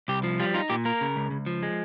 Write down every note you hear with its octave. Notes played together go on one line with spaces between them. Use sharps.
C2 G4
F3
G3 F4
D#4 F4
A#2 G4
A#3 A#4
C#3
C#2
C#2
F3
G#3